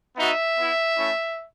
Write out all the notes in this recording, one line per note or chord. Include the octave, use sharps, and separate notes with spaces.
B3 D#4 F#4 E5
B3 E4
A3 C#4 E4